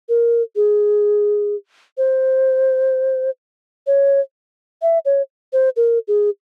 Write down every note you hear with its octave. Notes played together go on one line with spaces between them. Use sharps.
A#4
G#4
C5
C#5
E5
C#5
C5
A#4
G#4